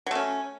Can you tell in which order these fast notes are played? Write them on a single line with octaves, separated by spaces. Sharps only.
F#3 A3 C#4